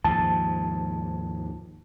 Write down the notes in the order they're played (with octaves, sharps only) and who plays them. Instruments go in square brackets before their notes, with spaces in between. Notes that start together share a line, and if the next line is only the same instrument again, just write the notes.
[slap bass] D#2 G#2 F3 [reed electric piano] A5